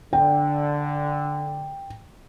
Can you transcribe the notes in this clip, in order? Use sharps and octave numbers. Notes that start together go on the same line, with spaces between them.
D3 G5